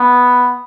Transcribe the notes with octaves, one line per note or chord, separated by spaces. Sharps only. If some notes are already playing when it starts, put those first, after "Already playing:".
Already playing: B3